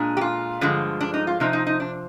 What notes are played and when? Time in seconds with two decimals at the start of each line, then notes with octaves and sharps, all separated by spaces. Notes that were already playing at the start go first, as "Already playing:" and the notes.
Already playing: A#2 G#3 D4
0.17 G4
0.21 F4
0.61 G2 D3 F3 G#3
1.01 D4
1.14 D#4
1.27 F4
1.40 C3 F3 C4 D#4
1.53 D#4
1.67 D#4
1.80 D4